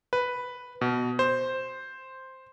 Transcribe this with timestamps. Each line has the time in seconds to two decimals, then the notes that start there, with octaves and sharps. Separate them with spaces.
0.13 B4
0.81 B2
1.19 C5